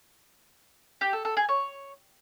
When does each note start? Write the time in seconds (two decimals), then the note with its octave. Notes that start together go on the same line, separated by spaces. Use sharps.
1.01 G4
1.13 A4
1.25 A4
1.37 G#4
1.49 C#5